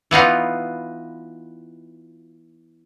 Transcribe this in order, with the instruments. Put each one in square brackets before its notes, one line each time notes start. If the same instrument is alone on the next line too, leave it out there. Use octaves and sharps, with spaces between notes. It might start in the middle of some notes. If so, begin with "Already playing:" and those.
[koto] E3 B3 D#4 F4